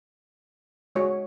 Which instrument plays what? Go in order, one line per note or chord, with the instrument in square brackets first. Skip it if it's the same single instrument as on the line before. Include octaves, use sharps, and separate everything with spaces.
[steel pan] G#3 F#4 C#5